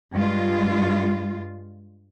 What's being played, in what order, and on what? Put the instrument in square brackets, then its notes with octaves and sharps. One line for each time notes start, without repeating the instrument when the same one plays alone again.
[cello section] G2 G#3 F4